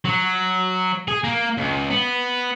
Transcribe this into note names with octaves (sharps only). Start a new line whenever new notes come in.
F#3
G#4
A#3
C#2
B3